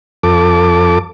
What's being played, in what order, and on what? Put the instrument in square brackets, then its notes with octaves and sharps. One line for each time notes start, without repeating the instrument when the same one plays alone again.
[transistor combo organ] F2 A4 D6